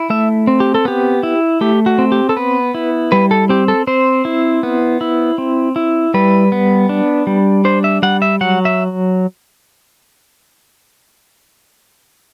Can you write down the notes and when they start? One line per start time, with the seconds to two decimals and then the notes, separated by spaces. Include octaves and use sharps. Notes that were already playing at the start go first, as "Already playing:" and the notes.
Already playing: E4
0.10 A3 E5
0.47 C4
0.60 G4
0.75 A4
0.85 B3 G4
1.23 E4
1.61 A3 G4
1.86 F#4
1.98 C4
2.12 G4
2.29 A4
2.36 B3 B4
2.75 E4
3.12 G3 B4
3.31 A4
3.49 C4 G4
3.68 A4
3.87 C4 C5
4.25 E4
4.63 B3
5.01 E4
5.38 C4
5.76 E4
6.14 G3 B4
6.52 B3
6.89 D4
7.27 G3
7.65 D4 C5
7.84 E5
8.03 G3 F#5
8.22 E5
8.41 F#3 F#5
8.65 E5